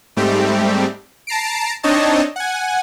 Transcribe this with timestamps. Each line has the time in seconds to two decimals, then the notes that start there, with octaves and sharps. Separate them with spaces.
0.17 G#2 G3 A3 C4 G4
1.27 A5 A#5 C7 D7
1.83 C4 D4 D#4 C#5 D#5 A5
2.36 F#5 G#5